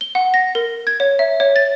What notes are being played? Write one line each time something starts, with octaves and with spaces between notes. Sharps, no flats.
G7
F#5
A#6
A#4
G#6
C#5
E5
C#5
A6